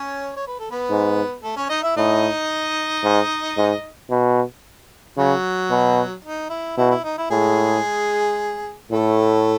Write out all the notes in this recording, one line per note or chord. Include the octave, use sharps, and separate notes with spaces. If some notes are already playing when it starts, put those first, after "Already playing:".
Already playing: C#4 C#5
C#5
B4
A4
B3 B4
G#2
A3 A4
C#4 C#5
D#4 D#5
E4 E5
A2 D#4 D#5
G#2
G#2
B2
C#3 F#3 F#4
B2
D#4
E4
B2 E4
E4
D#4
E4
A2 G#3 G#4
A2 A3 A4